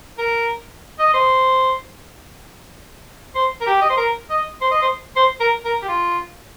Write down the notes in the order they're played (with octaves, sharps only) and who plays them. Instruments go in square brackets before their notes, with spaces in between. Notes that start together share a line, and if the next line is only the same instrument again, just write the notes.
[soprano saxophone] A#4
D#5
C5
C5
A#4
G4
D#5
C5
A#4
D#5
C5
D#5
C5
C5
A#4
A#4
G4
F4